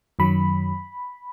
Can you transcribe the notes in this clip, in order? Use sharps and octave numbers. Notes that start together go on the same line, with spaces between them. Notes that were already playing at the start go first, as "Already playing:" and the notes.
F#2 D#3 F#3 B5